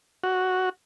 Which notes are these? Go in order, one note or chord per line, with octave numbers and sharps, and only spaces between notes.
F#4